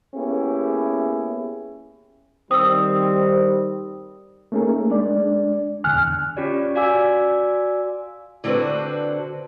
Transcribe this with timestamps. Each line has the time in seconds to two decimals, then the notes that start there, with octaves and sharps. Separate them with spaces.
0.15 A#3 B3 C#4 E4 G4 G#4
2.51 D#3 G3 C4 D#6 E6
4.52 A3 A#3 C#4 D#4 G#4 A#4
4.91 G#3 D4 D5
5.84 E2 A#2 D3 G#5 F6 F#6
6.37 C#4 F4 G4 C#5 D5
6.75 F#4 D5 F5 G#5 D6 E6
8.44 D3 C4 D4 F#4 B4 C5